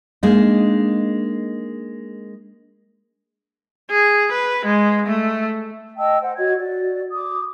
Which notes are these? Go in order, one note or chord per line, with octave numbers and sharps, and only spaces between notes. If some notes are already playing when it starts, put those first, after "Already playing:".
G#3 A#3 D4 D#4
G#4
B4
G#3
A3
D#5 G5 A5 E6
C5 F#5
F#4 C#5 D#5 G#6
F#4 D5
D6 D#6